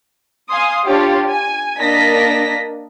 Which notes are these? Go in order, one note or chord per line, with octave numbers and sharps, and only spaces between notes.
F5 G#5 C6 D#6
D4 F4 G4 C#5
G#5
A#3 D4 D#5 A#6 B6